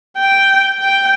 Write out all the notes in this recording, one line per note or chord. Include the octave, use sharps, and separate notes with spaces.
G5
G5